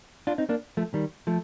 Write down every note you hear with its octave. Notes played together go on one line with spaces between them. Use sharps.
D4 F4
C4 D#4
A#3 D4
F3 A3
D#3 G3
F3 A3